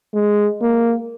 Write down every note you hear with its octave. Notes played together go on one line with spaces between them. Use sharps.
G#3
A#3